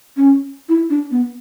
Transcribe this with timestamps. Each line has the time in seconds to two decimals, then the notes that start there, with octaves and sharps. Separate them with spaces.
0.17 C#4
0.69 E4
0.90 D4
1.11 B3